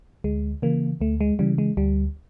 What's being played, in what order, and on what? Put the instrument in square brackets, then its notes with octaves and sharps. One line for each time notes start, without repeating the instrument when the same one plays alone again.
[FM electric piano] D2 G#3
C#3 E3 A#3
D2 A3
G#3
C#3 E3 G3
G#3
D2 G3